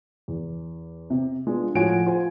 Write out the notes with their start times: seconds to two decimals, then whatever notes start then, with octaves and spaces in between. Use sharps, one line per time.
0.28 E2
1.10 C3
1.47 G#3 B3 D4 F4
1.75 A2 F3 F#4 C#5 G#5 D7
2.06 F4 C5 G#5